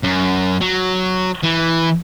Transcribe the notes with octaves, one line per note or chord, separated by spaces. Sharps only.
F#2
F#3
E3